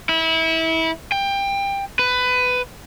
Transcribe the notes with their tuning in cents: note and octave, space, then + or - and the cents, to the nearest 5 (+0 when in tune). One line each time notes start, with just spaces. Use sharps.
E4 -25
G5 +20
B4 +15